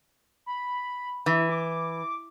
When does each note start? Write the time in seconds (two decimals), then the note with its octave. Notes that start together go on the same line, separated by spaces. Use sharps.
0.46 B5
1.26 E3 E4
1.49 D6